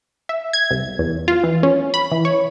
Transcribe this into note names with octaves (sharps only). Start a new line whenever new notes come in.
E5
G#6
C2
E2
F4
E3
C#4
B5
E3
C#5